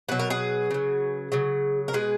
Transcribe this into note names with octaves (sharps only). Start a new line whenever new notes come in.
B2 F#3 B4
A#4
G#4 B4
C#3 F#3
C#3 F#3
A#4
B2 G#3 G#4 B4